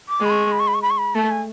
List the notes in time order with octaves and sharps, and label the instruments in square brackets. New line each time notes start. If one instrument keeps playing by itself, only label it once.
[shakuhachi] D6
[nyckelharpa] G#3 [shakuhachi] B5
[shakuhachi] C#6
B5
C#6
B5
C#6
B5
C#6
B5
[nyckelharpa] A3 [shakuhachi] A5
[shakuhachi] G#5